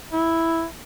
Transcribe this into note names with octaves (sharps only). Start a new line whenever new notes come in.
E4